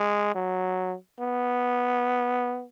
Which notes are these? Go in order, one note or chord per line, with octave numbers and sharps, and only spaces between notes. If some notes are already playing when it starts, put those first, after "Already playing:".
Already playing: G#3
F#3
B3